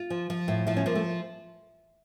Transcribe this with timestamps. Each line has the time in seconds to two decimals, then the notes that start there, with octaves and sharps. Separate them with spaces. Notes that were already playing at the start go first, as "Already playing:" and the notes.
Already playing: F4
0.10 F3
0.30 F3
0.48 A2
0.67 F3 E4
0.77 C#4
0.86 F3 A#3
0.95 A3